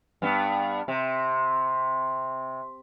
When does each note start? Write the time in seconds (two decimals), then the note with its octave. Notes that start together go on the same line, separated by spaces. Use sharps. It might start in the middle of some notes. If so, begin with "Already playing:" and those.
0.22 G2 B3
0.88 C3